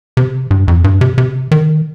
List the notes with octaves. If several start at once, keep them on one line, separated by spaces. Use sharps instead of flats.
C3
G2
F2
G2
C3
C3
D#3